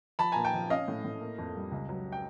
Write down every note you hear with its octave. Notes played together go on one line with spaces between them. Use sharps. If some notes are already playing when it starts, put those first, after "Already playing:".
F3 A5 B5
A#2 G#5 A#5
G5 A5
F3
C#4 D#5 F5
A2
A2
A#3
F2
G3
C#2
F#3
G5